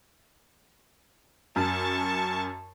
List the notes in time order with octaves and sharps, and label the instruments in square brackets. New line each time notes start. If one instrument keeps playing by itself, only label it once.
[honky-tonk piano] F#2 [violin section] A5 C#6